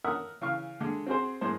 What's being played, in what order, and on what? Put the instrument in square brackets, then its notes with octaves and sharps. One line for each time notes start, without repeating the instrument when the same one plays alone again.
[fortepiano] A#4 E5 F#5 D#6 E6
C#3 E3 F5 C#6
D3 G#3
C4 F#4 G#4 C5
F#2 A2 G#3 C5